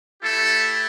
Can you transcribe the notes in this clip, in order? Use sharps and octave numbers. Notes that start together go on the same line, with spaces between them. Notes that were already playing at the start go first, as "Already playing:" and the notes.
A3 E4 G4 A4